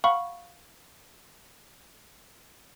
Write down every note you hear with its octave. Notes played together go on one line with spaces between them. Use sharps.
F5 F#5 B5 C#6